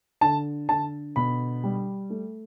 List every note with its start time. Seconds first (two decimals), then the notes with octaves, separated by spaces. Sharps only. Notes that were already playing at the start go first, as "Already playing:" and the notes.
0.21 D3 A5
0.69 D3 A5
1.16 B2 B5
1.64 G3
2.10 A3